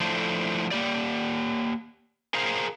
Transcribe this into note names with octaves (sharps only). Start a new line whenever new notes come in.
F3 A3 D4 E4 A4 C5
A#3 G4 D5
G#4 A#4 C5 F5 A#5